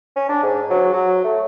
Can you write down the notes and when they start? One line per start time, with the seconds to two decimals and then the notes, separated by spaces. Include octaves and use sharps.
0.16 C#4
0.29 D4
0.43 G#2
0.70 F#3
0.93 F#3
1.24 A3